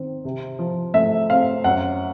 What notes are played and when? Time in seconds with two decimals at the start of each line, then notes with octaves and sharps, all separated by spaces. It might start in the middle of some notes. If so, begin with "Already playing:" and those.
Already playing: D#3 C4
0.25 C3
0.59 F3
0.94 A3 E5
1.30 C4 F5
1.64 F#2 F#5